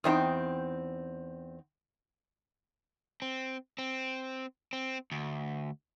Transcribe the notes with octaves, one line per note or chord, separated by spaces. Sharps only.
E2 C4 D4 D#4 G5
C4
C4
C4
D2